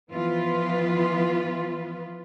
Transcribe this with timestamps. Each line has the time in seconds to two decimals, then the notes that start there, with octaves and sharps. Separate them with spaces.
0.12 E3 F3 B3 F4 B4